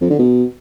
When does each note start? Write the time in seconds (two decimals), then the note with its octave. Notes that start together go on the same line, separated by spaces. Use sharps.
0.01 F2
0.10 D3
0.19 B2